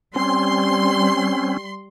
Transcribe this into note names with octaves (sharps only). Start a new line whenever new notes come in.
G3 C4 C#4 C6